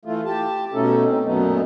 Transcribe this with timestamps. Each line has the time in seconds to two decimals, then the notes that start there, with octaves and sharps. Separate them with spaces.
0.05 E3 A3 F4
0.25 G4 A5
0.74 B2 A3 C#4 D#4 A4
1.08 C4 D#4
1.25 F#2 A#2 F#3 A3 B3 D#4